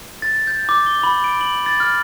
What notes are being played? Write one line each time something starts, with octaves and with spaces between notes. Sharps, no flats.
A6
G6
D6
G7
B5
D7
F#7
A6
F6